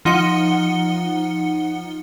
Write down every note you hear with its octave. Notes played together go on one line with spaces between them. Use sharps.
F3 D#4 F#5 C#7 G7